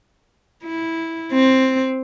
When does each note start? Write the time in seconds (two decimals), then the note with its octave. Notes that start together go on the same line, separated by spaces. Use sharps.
0.64 E4
1.33 C4